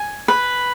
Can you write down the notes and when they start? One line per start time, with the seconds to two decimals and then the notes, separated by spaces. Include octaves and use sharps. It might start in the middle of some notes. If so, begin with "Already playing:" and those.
Already playing: G#5
0.28 B4